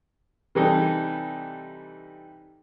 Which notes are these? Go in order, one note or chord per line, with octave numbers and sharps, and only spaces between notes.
C3 E3 G3 D#4 A4